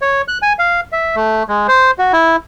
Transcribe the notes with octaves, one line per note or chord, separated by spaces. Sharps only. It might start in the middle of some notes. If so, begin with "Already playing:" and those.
C#5
F#6
G#5
F5
E5
A3
G#3
C5
F#4
E4